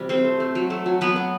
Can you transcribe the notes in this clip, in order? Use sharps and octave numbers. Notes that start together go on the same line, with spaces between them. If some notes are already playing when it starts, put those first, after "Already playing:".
Already playing: C3 E3 G3
A3 C4 C5
A3
A3
F#3
A3
F#3
F#3 B3 B4
B3